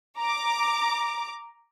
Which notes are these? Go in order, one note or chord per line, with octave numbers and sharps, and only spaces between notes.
A#5 D6